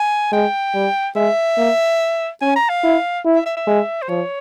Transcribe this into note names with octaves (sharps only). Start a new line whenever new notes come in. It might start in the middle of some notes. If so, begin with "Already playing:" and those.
Already playing: G#5
G#3 G5
G3
G#3 E5
A#3
C#4 G#5
A#5
F5
E4
E4
E5
E5
E5
G#3
C5
F3 C#5